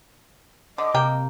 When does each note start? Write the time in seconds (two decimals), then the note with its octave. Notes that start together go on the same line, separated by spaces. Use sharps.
0.78 D3 D#5 D6
0.94 C3 A#3 G5